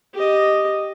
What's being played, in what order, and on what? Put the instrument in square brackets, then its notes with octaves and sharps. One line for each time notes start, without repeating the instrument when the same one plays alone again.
[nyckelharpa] G4 D#5